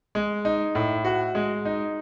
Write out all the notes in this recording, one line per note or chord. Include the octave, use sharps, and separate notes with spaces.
G#3
D#4
A2
F#4
G#3
D#4